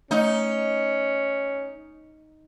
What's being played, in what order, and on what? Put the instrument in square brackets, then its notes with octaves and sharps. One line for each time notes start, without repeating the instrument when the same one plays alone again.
[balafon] A3 D#5 [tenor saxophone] C#4 [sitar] D#4